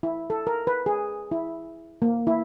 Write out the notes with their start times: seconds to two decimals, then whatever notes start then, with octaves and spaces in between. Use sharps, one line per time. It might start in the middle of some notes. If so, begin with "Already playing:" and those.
0.03 E4
0.30 A4
0.47 A#4
0.67 B4
0.86 G#4
1.31 E4
2.02 A#3
2.27 E4